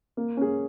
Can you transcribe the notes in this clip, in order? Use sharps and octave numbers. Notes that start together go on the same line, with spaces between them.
A#3
C#4 G#4